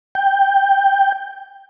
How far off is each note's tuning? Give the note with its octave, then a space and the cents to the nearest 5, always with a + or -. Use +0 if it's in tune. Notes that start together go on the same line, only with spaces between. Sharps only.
G5 +5